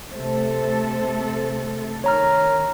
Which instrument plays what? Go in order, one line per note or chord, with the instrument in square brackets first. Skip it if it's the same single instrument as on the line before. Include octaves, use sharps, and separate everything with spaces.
[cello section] C3 A3 A4 [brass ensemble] C5
[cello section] D#3 [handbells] C#5 A#5 F6